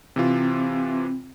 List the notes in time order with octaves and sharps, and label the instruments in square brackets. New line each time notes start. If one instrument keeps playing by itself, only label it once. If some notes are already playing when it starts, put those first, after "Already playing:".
[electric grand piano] C3 E3 F4 [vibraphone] C4